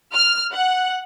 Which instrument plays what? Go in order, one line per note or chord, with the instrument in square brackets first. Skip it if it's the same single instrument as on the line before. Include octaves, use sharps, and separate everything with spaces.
[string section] F6
F#5